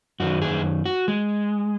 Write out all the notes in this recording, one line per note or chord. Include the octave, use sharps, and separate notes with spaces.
F#2 D#3 F#4
G#4
F#4
G#3